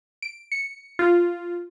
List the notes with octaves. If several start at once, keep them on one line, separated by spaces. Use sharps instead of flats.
D7
C#7
F4